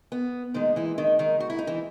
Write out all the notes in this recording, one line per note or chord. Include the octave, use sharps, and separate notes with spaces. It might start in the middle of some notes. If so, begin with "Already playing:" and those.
B3
A#2 D#3 G#3 D#4
E3 E4
D#3 D#4
D#3 D#4
F#4
E4
D#4
E3 E4